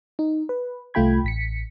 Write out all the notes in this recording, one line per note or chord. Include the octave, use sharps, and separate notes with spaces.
D#4
B4
C2 A3 F4 G5 B5 G#6
A1 B6 C#7